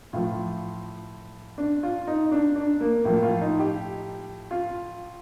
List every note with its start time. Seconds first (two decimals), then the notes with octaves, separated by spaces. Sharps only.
0.13 A2 F3 F4
1.58 D4
1.83 F4
2.07 D#4
2.32 D4
2.56 D4
2.81 A#3
3.04 A2 F3 A#3
3.23 F4
3.41 D#4
3.59 G4
4.51 F4